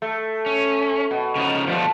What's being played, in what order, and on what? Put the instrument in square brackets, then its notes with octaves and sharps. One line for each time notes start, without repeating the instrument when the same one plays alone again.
[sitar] A3
[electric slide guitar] C#4
[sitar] B2
[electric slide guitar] C#3 F3 D#4
[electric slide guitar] B2 G3 A3 [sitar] F3